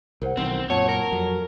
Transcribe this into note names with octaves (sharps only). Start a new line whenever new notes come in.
C2 A#4 C5 F#5
B1 D#3 E3 C4
F#2 A#2 C#5 F#5 A5
A#4
F2 F#3